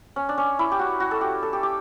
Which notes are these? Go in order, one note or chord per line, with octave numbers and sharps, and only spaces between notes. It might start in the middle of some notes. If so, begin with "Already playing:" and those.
C#4
D4
C#4
E4
G4
F#4
F#4
A4
G4
A4
G4
G4